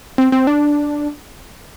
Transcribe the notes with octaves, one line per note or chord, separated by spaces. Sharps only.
C4
C4
D4